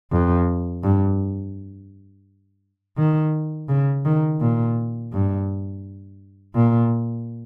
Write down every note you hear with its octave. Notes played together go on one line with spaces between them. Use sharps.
F2
G2
D#3
C#3
D#3
A#2
G2
A#2